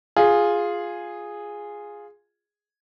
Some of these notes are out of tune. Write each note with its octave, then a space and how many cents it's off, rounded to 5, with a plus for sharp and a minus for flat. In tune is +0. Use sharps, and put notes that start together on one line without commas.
F4 +5 G#4 -5